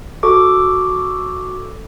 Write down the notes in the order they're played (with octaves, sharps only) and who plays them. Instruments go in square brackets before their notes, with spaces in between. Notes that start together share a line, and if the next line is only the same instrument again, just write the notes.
[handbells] F#4 A4 C#6 D6